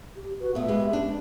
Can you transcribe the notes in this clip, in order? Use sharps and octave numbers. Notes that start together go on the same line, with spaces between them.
G4
F#4 B4
A#2 A3 B3 E5
G#3 B3 G4
C#4 D4